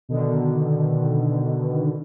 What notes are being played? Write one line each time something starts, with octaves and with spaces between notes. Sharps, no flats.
B2 D3 D#3